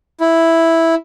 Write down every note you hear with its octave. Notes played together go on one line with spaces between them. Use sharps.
E4